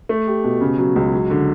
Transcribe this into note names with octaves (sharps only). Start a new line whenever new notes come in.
A3
G4
B2
C#3
F#3
C#2
F#3
D3